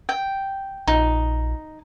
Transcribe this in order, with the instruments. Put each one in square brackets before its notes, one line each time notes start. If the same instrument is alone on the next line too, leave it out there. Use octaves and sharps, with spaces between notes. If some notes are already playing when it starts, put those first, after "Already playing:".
[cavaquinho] G5
[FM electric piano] A#1 [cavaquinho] D#4